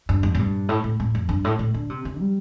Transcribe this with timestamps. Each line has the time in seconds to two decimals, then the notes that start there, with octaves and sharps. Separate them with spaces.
0.09 G2
0.23 F2
0.35 A2
0.39 G2
0.69 A2
0.84 A2
1.00 A2
1.15 F2
1.29 G2
1.44 A2
1.59 A2
1.74 D3
1.90 C3
2.05 C3
2.19 G3